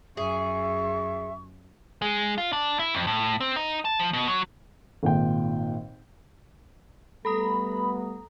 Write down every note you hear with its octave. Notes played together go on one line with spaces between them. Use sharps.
F#2 G#4 E5 C#6
G#3
F4
D4
E4
F2
A2
C4
D#4
A5
F3
B2
F#3
G#1 A#2 G5
G3 A3 B3 A4 A#5 B5 D#6